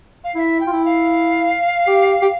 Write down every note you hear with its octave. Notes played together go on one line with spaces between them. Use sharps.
F5
E4 E5 F5
G5
F4
E4
F5
G4
G4